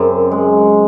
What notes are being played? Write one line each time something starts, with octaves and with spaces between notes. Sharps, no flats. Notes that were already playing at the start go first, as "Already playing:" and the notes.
Already playing: F#2 C#3 C4
G#3